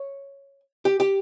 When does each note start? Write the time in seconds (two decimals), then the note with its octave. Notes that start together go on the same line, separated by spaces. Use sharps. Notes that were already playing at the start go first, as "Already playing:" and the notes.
Already playing: C#5
0.85 G4
1.00 G4